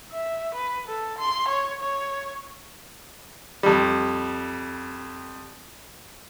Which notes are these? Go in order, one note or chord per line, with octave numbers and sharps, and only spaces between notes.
E5
B4
A4
C6
C#5
C#5
F2 G3